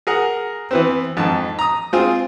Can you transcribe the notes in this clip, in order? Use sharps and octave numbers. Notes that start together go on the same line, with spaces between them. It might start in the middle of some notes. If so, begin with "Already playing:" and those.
G#4 A#4 F#5
E3 B3 C4
F2 G#2 A5
A#5 D#6
G#3 C4 F4 G#4